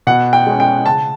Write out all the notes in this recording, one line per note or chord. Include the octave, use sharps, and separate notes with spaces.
B2 F#5
G5
G#3 C#4
G5
C#3 A5